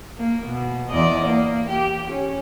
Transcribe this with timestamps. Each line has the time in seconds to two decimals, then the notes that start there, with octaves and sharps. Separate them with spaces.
0.18 A#3
0.46 B2
0.89 E2 D5 D#5
1.25 A#3
1.70 G4
2.11 C#4